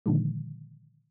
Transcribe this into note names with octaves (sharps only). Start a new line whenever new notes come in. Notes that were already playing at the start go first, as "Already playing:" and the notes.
A#2 D3 D#3 F3 G#3